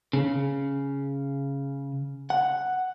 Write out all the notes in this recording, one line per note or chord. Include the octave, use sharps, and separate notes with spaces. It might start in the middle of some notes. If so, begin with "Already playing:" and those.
C#3
F#5